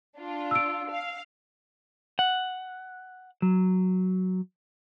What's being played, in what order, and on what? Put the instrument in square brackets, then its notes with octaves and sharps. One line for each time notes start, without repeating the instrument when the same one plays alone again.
[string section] D4 F4
[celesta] E6 D7
[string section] F5
[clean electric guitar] F#5
F#3